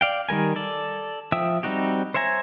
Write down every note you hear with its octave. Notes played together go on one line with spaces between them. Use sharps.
D5 F5 G5
D#3 G3 A#4 G#5
A4 D5
F3 E5 G5 D#6 E6
G3 C4 D#4 F#4 G4
C5 C#5 E5 G#5 A#5